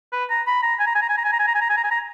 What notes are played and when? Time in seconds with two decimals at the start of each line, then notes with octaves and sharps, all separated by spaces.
0.12 B4
0.30 A#5
0.47 B5
0.62 A#5
0.79 G#5
0.87 A#5
0.95 G#5
1.02 A#5
1.09 G#5
1.18 A#5
1.24 G#5
1.32 A#5
1.39 G#5
1.47 A#5
1.55 G#5
1.61 A#5
1.70 G#5
1.77 A#5
1.84 G#5
1.91 A#5